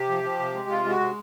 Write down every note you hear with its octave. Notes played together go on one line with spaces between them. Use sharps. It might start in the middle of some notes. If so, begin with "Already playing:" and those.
Already playing: C3 G4
F3
F3
C3
G#3
C3 F4
G#3
F#4
C3